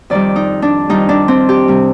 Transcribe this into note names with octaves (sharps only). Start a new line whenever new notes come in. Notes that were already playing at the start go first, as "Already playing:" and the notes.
F2 D#3 G3 D5
D#4
D4
F2 D#3 G3 D#4
D4
C4
G4
C3 G3